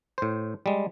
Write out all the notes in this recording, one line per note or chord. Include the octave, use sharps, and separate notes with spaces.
A2 C5
G3 G#3